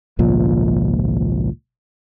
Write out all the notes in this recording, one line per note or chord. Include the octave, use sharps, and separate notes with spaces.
G#1 C#2 A#2 F3